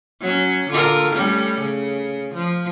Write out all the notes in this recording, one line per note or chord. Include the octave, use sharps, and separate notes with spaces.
F#3 C#4
D3 F4 A#4
G3 A3 C#4
C#3
F3